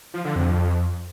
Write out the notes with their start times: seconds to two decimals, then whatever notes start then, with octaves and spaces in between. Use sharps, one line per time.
0.14 F3
0.25 D3
0.36 F2